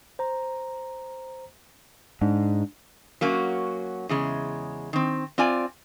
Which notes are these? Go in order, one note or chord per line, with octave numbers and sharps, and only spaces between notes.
C5 A#5
G#2 D4
F#3 A#3 C#4 F#4
E2 C#3 G#3
D#3 C4
C4 F4 D5 G#5